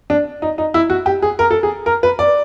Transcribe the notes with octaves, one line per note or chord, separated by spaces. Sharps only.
D4
D#4
D#4
E4
F#4
G4
G#4
A#4
A4
G#4
A#4
B4
D5